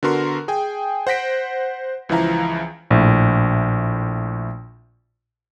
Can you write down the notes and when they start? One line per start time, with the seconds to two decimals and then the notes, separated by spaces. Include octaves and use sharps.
0.03 D3 B3 F#4 A#4 C6
0.48 G#4 G5 G#5
1.07 C5 F#5 A#6 B6 D7
2.09 C#2 E3 F3 E4 F5 A#5
2.90 A#1 A2